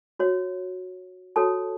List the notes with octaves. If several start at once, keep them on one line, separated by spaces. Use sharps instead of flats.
F#4 C#5
F#4 A4 C#5 A5